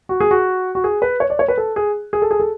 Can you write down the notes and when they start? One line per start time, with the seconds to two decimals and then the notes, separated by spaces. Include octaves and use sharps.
0.09 F#4
0.20 G#4
0.31 F#4
0.75 F#4
0.84 G#4
1.02 B4
1.20 C#5
1.30 D5
1.39 C#5
1.48 B4
1.58 A4
1.76 G#4
2.13 G#4
2.22 A4
2.31 G#4
2.40 A4